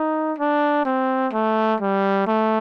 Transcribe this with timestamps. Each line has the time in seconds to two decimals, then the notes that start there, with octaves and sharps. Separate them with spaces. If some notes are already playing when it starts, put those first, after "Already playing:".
Already playing: D#4
0.38 D4
0.85 C4
1.33 A3
1.80 G3
2.27 A3